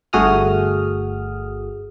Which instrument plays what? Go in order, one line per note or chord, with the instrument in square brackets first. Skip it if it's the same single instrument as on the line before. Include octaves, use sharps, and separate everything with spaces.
[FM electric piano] G1 A3 F#4 G#4 D#6 F6